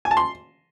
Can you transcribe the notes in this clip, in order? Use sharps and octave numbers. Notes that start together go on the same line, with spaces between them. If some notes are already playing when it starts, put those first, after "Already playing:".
G#5
A5
C6